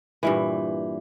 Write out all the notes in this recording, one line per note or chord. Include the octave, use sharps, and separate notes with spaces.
G2 A#2 E3